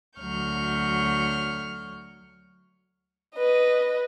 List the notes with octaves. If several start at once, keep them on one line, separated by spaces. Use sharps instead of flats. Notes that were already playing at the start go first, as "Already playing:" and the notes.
D2 F#3 C#5 C#6 F6 G6
B4 D#5